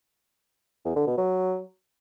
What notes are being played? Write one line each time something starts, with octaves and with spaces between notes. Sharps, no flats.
E2
D3
B2
F#3